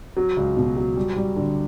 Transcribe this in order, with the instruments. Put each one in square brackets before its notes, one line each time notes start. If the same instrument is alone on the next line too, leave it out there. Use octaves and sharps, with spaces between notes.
[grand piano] F#3
C#2
B2
F#3
G3
G3
D3